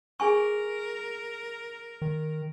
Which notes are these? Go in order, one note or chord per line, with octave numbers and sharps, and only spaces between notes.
G#4 A#4 G#5 C#6
D#3